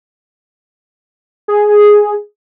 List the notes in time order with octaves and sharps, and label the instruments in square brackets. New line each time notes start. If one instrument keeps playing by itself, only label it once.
[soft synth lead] G#4